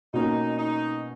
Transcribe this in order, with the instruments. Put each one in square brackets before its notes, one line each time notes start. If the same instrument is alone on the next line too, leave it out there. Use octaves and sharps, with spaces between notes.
[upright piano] B2 A#3 C#4 [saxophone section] D#4
[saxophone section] D#4